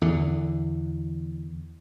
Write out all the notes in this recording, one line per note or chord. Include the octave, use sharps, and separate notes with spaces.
E2 D3